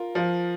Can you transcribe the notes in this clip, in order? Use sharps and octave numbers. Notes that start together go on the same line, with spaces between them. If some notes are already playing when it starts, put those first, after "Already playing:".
Already playing: F4 A#4
F3